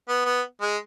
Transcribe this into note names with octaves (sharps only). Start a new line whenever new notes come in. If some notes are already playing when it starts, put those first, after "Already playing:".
B3
B3
G#3